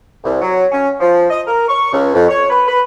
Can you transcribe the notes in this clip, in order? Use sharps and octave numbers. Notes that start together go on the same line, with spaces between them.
C2
F#3
C#4
F3
D#5
A#4
C#6
C#2
F2
C#5
B4
B4